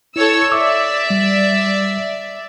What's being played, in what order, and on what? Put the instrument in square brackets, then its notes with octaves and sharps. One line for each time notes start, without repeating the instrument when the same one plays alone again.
[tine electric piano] E4 [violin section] A4 C#5 E6
[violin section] D5 E5 [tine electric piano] D6 E6
[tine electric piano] G3